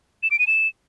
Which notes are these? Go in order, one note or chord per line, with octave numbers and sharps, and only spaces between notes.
E7
D7
D#7
E7